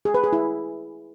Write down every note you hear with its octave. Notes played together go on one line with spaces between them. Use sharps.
G#4
B4
G#4
E4